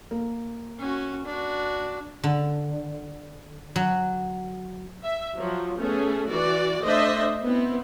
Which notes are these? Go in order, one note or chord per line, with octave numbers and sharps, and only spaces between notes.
A#3
C#4 F#4
D4 F#4
D3
F#3
E5
F3 F#3
A3 B3 C#4 G#4
E3 F#4 D5
A3 D4 C5 D#5 E5
B3 C4 E4